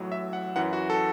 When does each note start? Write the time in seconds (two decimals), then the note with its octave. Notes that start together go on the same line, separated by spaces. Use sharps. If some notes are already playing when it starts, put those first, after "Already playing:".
Already playing: A1 A2 F#3
0.12 E5
0.33 F#5
0.56 F#2 E3 F#5
0.73 F#4
0.90 A4